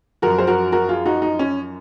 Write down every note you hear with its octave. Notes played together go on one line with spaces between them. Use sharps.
F#2 F3 F#4 A#4
C5
F#4 A#4
F#4 A#4
F4 G#4
D#4 F#4
D#4
C#4